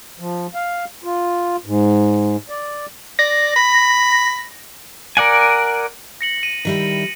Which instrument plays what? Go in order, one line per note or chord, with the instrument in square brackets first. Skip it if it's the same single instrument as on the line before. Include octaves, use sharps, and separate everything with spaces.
[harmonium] F3
F5
F4
G#2
D5
[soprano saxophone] D5 [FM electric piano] A#6
[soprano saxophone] B5
[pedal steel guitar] A#4 D5 F#5 G#5
[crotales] A#6 C#7 F#7
D#7
[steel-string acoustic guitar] D#3 G3 E4